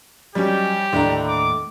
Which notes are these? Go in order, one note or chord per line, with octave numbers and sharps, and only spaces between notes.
F#3 G3 C#4 D#4 G4
D#2 A2 D3 D4 E4 A#5
D6